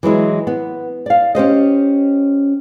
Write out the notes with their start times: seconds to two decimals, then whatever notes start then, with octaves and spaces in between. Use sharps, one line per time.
0.03 E3 F#3 G#3 E4
0.47 B3
1.06 D5 F5
1.35 C#4 G4 C5 D#5